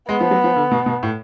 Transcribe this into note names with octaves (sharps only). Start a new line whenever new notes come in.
G#3 B3
F3
F#3
F3
D3
B2
B2
A2